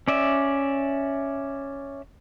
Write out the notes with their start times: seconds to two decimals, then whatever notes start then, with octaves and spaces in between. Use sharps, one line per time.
0.08 C#4 D5 E5